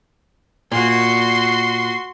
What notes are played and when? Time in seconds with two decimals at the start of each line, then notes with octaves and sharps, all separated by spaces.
0.72 A#2 F#4 C6